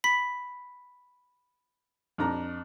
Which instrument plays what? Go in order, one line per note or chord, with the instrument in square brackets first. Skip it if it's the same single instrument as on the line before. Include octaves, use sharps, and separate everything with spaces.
[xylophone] B5 B6
[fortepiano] F2 D4 A#5